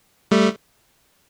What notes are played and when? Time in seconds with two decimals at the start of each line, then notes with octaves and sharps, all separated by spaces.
0.31 G3 A3